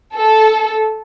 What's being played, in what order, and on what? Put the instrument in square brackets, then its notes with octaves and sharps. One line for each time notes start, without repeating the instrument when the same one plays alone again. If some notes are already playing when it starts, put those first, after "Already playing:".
[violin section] A4